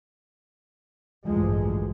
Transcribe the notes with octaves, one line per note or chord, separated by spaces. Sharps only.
A1 D2 G2 F3 G#3